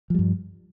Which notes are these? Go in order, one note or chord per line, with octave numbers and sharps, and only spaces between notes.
G2 F3 G3